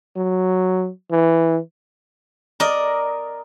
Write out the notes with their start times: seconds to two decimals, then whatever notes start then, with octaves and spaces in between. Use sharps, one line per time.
0.17 F#3
1.11 E3
2.60 A#4 D5 D#5